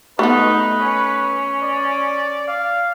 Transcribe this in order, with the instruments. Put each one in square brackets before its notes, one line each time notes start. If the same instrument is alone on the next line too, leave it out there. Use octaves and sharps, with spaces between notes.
[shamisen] A3 B3 [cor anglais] D#4 [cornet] B4
[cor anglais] C#4
[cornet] D5
F5